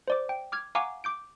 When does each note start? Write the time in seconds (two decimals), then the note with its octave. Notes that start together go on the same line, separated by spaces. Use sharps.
0.08 C5 D5 D6
0.29 G5
0.52 D6 F6 G#6
0.75 F5 F#5 G#5 A#5 C#6 D6
1.04 D6 G6 D7